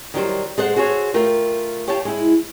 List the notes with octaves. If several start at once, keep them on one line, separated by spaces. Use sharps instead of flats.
D#3 F#3 G3 C5
G#3 A4 C5 F#5
F#4 G#4 A4 C5 C#5
A3 F4 A#4 G5
G4 C#5 F5 G5 A5
G#3 E4